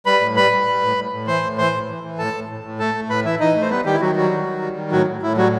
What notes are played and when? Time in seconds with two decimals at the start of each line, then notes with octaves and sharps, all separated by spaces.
0.06 G3 B4 B5
0.21 A2
0.36 G3 B4 B5
0.52 G3
0.66 G3
0.83 A2
0.97 A2
1.12 A2
1.27 E3 C5 C6
1.43 A2
1.58 E3 C5 C6
1.73 A2
1.88 E3
2.04 E3
2.19 A2 A4 A5
2.34 A2
2.49 A2
2.64 A2
2.79 A3 A4 A5
2.95 A3
3.10 A2 B4 B5
3.25 E3 E4 E5
3.40 E3 D#4 D#5
3.56 A3
3.61 C5
3.70 G3 B3 B4
3.85 D#3 G3 G4
3.94 E4
4.01 D#3 F#3 F#4
4.16 F#3 G3 F#4
4.31 D#3
4.46 D#3
4.61 G3
4.76 D#3
4.92 A2 F#3 F#4
5.07 A2
5.22 A2 E4
5.37 F#3 G3 F#4